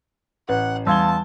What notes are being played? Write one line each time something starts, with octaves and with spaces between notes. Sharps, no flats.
A1 B4 F#5
E2 G3 F5 A5 C6 E6 G#6 G7